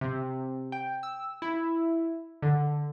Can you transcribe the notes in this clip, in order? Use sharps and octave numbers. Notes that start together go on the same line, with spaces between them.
C3
G5
E6
E4
D3